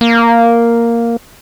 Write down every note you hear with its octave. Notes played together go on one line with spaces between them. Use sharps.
A#3